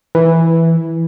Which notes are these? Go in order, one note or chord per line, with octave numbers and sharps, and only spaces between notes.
E3